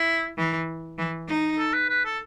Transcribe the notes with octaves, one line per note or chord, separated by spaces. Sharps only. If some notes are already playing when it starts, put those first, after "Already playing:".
Already playing: E4
E3
E3
D#4
A4
B4
B4
A4